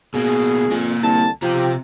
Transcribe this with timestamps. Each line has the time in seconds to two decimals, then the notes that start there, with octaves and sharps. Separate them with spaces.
0.14 B2 A#3 G#4
0.70 F2 A#3 G#5
1.02 C2 D3 A5
1.42 C3 F3 G4 A#5